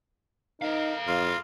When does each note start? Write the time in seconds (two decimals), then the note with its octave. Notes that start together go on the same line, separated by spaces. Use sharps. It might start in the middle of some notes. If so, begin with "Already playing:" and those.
0.61 D#4 A4 A#4 F5
1.07 F2 F4